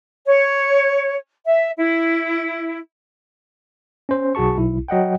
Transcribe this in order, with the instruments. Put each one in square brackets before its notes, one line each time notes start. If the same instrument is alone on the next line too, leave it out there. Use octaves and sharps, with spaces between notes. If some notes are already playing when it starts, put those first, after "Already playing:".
[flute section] C#5
E5
E4
[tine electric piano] C#4 C5
B1 F#4 G#4 A5 C#6
B1 E4
F#3 D#5 F#5 G5